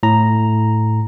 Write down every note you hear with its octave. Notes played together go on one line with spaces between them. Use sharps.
A2 A#5